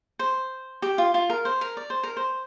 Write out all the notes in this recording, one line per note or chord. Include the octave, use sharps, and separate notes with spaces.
C5
G4
F4
F4
A#4
C5
A#4
D5
C5
A#4
C5